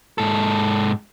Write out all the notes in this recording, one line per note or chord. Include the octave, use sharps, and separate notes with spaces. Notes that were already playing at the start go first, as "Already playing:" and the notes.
G#2 A4